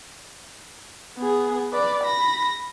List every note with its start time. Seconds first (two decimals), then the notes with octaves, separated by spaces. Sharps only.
1.18 B3 G#4
1.72 B4 D5
2.04 B5 A#6